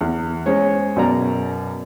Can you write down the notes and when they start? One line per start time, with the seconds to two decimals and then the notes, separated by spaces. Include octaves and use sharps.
0.01 E2
0.46 G#3 C#4 C5 C#5
0.96 F#2 B2 D5 A#5